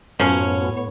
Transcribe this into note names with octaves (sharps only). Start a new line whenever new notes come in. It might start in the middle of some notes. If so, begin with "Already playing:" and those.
F#2 A2 F3 B3 C#4 C#5